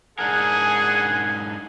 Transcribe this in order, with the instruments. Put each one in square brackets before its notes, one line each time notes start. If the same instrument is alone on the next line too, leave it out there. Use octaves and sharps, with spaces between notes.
[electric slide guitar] G#2 D4 A#4 [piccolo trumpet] G#4 [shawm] F#5 [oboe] G#5